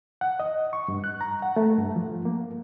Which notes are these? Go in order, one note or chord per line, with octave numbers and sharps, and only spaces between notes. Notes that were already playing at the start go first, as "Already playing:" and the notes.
F#5
D#5
C#6
G2
F#6
A#5
F#5
A3
G2
F3
A#3